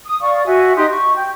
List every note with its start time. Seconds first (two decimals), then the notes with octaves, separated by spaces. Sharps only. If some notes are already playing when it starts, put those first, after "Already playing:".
0.05 D#6
0.21 D5 F5 C#6
0.45 F#4 E5 G#5
0.76 D#4 G4 C6 D#6
0.88 C#6
1.16 G5